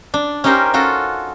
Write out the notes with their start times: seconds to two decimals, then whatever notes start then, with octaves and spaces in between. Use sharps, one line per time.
0.14 D4
0.44 C#4 D#4 G4 A#4 C5
0.73 C#4 F4 F#4 A4